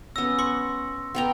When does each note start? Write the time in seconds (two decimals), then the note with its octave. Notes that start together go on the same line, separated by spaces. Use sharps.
0.16 B3 C#4 E6 A#6
0.39 C6 C#6
1.15 B3 G5 A#5